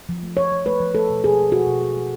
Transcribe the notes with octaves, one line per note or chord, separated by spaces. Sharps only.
F3
A3
F3 C#5
F3
A3 B4
F3
A3 A4
B2
B2 G#4
A3
B2 F#4
B2
A3
A3